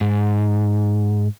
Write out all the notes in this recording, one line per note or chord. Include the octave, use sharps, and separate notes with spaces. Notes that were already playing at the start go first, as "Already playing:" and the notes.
G#2